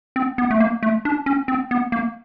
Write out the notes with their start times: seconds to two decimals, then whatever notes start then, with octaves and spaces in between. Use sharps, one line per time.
0.16 C4
0.38 B3
0.51 A3
0.60 A#3
0.83 A3
1.05 D4
1.26 C#4
1.48 C4
1.71 B3
1.92 A#3